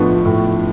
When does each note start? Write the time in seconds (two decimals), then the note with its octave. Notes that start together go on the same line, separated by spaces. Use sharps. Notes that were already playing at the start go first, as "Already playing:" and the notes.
Already playing: A2 F3 B3 D4 C#6
0.25 A2